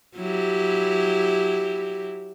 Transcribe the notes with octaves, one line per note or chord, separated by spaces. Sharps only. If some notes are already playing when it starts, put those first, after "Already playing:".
F#3 E4 G4